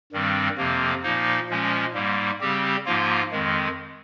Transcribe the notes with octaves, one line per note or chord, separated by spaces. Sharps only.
G2 D#3 G3 C4
F2 C3 F3 A#3
A#2 F3 A#3 D#4
A#2 F3 G#3 C#4
G#2 G3 A#3
C#3 G3 C4 G4
G#2 F3 A#3 F4
F2 D#3 G#3